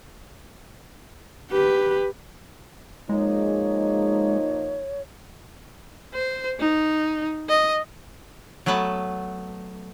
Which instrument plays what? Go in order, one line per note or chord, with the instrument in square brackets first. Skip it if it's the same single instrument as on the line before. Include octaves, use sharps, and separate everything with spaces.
[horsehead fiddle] G4 B4
[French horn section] F3 A#3 D#4 [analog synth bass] G#3 [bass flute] C#5
[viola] C5
D#4
D#5
[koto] F#3 A3 B3 B4 A5